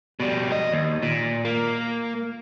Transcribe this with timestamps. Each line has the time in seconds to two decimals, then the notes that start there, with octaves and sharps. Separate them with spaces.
0.20 B2 G3
0.51 G2 D#5
0.71 D#2
1.03 A#2
1.45 A#3